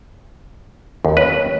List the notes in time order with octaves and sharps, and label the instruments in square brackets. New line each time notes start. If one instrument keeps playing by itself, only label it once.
[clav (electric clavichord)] D#2
[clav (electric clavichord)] B4 [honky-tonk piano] C#5